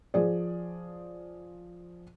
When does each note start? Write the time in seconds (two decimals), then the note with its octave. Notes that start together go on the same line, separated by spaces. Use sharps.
0.14 F3 G#4 D5